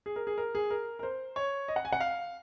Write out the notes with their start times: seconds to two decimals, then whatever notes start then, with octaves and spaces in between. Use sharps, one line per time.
0.06 G#4
0.16 A#4
0.27 G#4
0.38 A#4
0.55 G#4
0.70 A#4
0.99 A#4
1.03 C5
1.36 C#5
1.68 D#5
1.76 F#5
1.85 G#5
1.92 F#5
2.00 F5